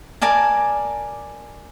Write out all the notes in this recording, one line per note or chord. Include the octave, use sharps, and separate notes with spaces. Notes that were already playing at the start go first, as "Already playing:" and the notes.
A#4 D5 G#5 A5